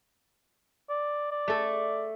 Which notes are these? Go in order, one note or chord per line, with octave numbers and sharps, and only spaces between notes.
D5
D5
A3 A4